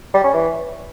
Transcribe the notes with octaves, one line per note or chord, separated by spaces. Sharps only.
G3
C#4
E3